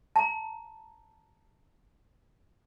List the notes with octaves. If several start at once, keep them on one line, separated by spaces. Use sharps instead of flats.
A5 A#5